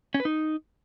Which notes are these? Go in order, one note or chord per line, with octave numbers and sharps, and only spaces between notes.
C#4
B4
D#4